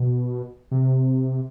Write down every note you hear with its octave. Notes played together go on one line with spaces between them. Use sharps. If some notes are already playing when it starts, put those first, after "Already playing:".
Already playing: B2
C3